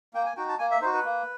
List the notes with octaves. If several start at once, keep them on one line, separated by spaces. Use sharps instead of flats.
A#3 G5
G#5
D#4 F#4 G5
A5
A#3 G#5
E5
D#4 F#4 C5
B4
A#3